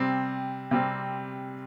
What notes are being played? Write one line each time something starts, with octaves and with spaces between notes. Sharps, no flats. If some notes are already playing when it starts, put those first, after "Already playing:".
Already playing: C3 G3 C4
C3 G3 C4